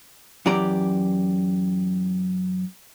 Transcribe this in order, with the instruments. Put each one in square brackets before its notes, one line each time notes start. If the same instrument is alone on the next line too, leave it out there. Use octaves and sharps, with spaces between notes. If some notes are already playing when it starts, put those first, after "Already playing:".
[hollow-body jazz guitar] F#2 E3 G4 D5 A#5